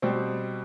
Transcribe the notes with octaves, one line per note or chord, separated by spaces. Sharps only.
B2 G3 C4